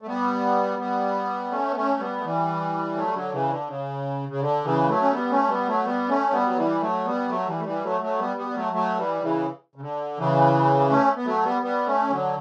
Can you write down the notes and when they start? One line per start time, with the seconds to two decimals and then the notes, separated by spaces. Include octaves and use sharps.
0.02 A3
0.07 G3 B3
0.79 G3 B3
1.51 A3 C#4
1.71 B3
1.76 A3 C#4
1.99 G3 B3
2.18 A3
2.24 E3 G3
2.95 F#3 A3
3.06 G3
3.14 D3 F#3
3.32 C#3 E3
3.49 D3
3.68 C#3
4.29 C#3
4.41 D3
4.64 C#3 E3
4.88 F#3 A3
5.02 C#4
5.12 G3 B3
5.31 A3 C#4
5.48 G3 B3
5.67 F#3 A3
5.85 G3 B3
6.09 A3 C#4
6.32 G3 B3
6.46 F#3
6.56 E3 G3
6.81 F#3 A3
7.05 G3 B3
7.29 F#3 A3
7.47 E3 G3
7.59 A3
7.65 E3 G3
7.83 F#3 A3
8.01 F#3 A3
8.19 G3 B3
8.37 G3 B3
8.49 G3
8.55 F#3 A3
8.73 F#3 A3
8.97 E3 G3
9.21 C#3 E3
9.75 C#3
9.81 D3
10.18 C#3 E3
10.90 A3 C#4
11.16 B3
11.25 F#3 A3
11.44 G3 B3
11.62 G3 B3
11.86 A3 C#4
12.10 D3 F#3